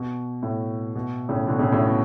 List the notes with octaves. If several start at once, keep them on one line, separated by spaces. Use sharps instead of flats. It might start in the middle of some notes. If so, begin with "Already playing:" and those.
Already playing: B2
A2
B2
A2 C#3
B2 D3
A2 C#3
A2 C#3
B2